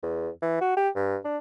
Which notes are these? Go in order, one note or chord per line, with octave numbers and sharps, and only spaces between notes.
E2
E3
F#4
G4
G2
D4